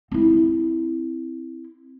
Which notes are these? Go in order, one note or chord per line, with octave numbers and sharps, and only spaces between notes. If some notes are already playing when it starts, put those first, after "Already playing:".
C4 E4